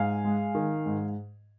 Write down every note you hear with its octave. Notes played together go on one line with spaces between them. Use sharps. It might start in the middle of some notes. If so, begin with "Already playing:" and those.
Already playing: G#2 F5 G#5
G#3
D#3
G#2